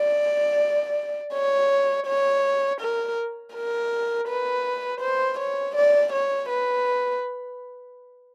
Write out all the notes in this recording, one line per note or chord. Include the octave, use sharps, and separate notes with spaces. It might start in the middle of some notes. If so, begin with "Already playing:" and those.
Already playing: D5
C#5
C#5
A#4
A#4
B4
C5
C#5
D5
C#5
B4